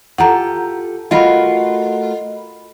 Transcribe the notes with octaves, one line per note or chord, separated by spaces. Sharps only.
F4 G4 A4 F#5 A#5
A3 F4 F#4 A#4 D#5 B5